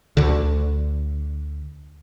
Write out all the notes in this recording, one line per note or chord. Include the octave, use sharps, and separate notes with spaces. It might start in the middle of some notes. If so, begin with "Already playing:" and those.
D2 D3